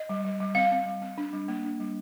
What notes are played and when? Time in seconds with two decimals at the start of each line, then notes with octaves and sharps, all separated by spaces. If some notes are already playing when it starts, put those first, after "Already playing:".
Already playing: D#5
0.09 G3
0.25 G3
0.40 G3
0.55 C4 F5
0.71 C4
0.86 G3
1.02 C4
1.18 D4
1.33 G3
1.48 A#3
1.65 D4
1.80 G3